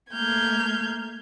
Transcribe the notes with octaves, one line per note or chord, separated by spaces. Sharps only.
A3 A#3 F6 G6 G#6